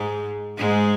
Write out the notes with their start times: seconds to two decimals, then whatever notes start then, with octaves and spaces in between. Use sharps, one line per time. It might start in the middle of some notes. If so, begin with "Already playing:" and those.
Already playing: G#2 G#3
0.58 G#2 G#3